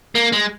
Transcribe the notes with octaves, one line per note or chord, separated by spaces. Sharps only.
A#3
G#3